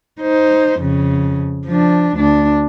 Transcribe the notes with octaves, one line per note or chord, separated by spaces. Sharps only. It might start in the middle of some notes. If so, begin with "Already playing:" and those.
D#4 C5
F2 C#3
F3 D4
D2 D4